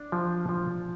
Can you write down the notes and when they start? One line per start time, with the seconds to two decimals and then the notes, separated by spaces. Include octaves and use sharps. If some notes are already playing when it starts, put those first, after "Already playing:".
Already playing: D4
0.12 F3
0.49 F3